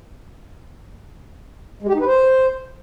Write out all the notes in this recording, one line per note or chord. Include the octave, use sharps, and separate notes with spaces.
G#3
G4
D#4
B4
C5